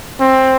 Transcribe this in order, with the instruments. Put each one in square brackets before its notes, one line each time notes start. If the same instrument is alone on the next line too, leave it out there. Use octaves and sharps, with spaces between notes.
[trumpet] C4